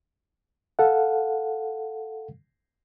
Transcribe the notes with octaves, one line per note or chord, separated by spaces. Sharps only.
A4 F5 F#5